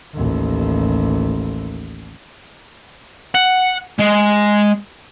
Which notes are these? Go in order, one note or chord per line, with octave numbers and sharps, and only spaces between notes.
A1 D#2
F#5
G#3